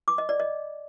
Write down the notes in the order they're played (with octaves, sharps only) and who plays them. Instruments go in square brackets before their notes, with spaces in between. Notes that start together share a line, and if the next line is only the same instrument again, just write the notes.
[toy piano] D6
D#5
D5
D#5